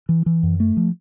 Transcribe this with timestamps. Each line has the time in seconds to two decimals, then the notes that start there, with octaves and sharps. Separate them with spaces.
0.09 E3
0.26 E3
0.43 F#2
0.60 A3
0.77 F3